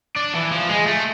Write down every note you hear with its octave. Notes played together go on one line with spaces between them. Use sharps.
D4
E3
F3
G#3
A3